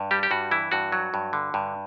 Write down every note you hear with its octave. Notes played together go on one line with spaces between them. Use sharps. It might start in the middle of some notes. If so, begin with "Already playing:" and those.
Already playing: G2
G3 G4
G4
G2 F#4
E3 E4
G2 F#4
F#3
G2
D3
G2